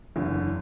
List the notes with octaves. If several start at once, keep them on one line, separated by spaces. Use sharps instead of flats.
F#1 E2 D3